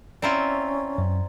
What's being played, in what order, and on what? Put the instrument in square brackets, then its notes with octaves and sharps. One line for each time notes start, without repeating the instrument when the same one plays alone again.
[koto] C4 E4 F4 [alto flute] C#4 [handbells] D5 A#5 C6
[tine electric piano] F#2